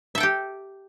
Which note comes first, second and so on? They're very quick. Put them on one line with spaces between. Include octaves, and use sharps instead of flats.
E5 A4 G5 G4